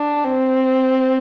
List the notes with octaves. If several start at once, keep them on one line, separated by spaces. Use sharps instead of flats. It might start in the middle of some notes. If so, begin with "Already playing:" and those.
Already playing: D4
C4